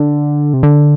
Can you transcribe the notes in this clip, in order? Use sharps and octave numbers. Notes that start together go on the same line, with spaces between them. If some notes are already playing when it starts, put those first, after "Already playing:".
Already playing: D3
C3
D3